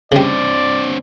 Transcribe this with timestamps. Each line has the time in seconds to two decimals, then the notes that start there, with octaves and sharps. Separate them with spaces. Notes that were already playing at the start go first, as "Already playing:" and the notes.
0.12 C#3 G3 C4 D4 D5